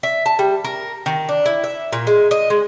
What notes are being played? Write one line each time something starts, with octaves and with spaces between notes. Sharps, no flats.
E5
A5
G3
A#4
D#3
D4
E4
E5
A#2
G#3
D#5
G#3